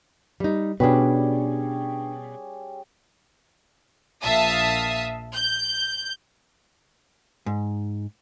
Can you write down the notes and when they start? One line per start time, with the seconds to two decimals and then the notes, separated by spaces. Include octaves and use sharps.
0.40 G3 D#4
0.80 B2 G3 C#4 D4 G#4 B4
4.22 A#1 E5 F5 A5 D#6
5.33 G6
7.46 G#2